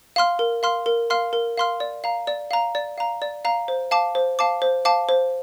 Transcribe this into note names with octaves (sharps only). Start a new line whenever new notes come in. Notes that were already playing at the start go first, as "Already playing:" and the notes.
F5 C6 F6
A#4
F5 C6 F6
A#4
F5 C6 F6
A#4
F5 C6 F6
D5
F5 A#5
D5
F5 A#5
D5
F5 A#5
D5
F5 A#5
C5
F5 A5 D6
C5
F5 A5 D6
C5
F5 A5 D6
C5